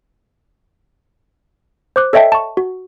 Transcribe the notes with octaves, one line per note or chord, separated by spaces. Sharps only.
C5 D6 F#6
A4 C#5 D#5 E5 G5 A5
A5 C#6
F#4